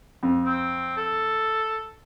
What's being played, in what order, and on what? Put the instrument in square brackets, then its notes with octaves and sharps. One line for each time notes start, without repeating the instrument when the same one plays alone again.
[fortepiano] F2
[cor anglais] C4
A4